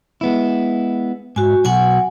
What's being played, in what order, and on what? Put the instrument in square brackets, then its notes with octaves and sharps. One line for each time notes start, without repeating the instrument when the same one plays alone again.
[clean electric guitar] G#3 B3 E4
[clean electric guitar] G#2 [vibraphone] F#4 G#5
[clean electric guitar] B1 F#4 [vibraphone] F#5 G#5